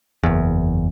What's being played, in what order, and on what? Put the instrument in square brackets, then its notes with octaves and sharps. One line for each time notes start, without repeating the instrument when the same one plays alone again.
[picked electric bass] F#1 E2